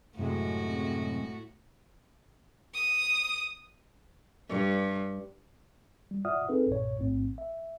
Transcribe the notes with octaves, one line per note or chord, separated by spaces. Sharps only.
F#2 A2 C3 G#3 F#4
D#6
G2
G3
F4 D5 E5 F#5 D#6 F6
C4 D#4 G#4 A4 B4
B1 G2 A#2 C#5
A1 G#2 A3 C4
E5